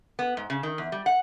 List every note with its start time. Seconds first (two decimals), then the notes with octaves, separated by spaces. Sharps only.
0.19 B3
0.37 G#2
0.50 C#3
0.63 D#3
0.78 E2
0.92 G3
1.06 F#5